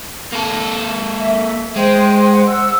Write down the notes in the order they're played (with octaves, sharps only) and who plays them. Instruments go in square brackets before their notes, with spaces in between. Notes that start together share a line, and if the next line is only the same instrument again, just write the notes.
[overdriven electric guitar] A#3 A4
[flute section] E5
[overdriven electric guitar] G#3 [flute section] C5 G5
[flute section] C5 F#5
F#5 E6